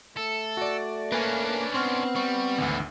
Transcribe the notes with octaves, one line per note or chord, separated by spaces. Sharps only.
A3 A4
F#4 D5
A#3 C#4 D4 B4 G#5
B3 C4 C6 C#6 F6
G3 C#6
G#1 D2 D3 E3